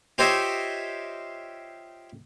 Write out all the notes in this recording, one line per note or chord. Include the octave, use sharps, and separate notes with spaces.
F4 G4 C5 C#5 D#5 E5